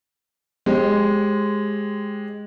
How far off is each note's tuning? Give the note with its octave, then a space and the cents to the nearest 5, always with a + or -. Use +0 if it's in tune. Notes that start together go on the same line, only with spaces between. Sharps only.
G#3 +0 G4 +0 C5 +40